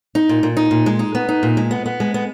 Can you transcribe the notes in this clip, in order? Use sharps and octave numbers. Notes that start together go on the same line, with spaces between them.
D#4
A#2
A#2
D#4
A#2
G#3
D#4
B3
D#4
A#2
G#3
B3
B3
G#3
B3